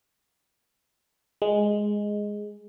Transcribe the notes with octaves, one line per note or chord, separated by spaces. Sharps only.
G#3